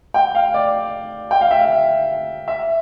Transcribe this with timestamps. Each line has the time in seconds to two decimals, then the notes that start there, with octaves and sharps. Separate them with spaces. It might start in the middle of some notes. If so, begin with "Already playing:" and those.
0.14 G5
0.35 F5
0.54 D5
1.31 G5
1.41 F5
1.51 E5
1.60 F5
2.48 E5